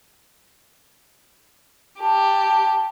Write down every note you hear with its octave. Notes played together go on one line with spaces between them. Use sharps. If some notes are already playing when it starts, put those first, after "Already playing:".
G4 A5